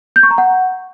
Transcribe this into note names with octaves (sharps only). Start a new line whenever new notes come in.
G6
C#6
A#5
F#5